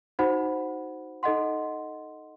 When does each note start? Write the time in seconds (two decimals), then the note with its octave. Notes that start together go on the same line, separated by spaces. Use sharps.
0.19 D#4 F#4 C5 F#5 B5
1.23 D#4 A4 D#5 F#5 C6